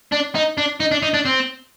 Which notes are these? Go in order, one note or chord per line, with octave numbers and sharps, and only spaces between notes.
D4
D#4
D4
D#4
D4
D#4
D4
C4